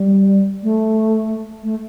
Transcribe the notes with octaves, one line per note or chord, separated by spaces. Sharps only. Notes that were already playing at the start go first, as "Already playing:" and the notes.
Already playing: G3
A3
A3